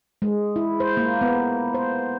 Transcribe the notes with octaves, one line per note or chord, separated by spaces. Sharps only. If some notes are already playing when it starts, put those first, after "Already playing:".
G#3
E4
C5
A#3
B3
C5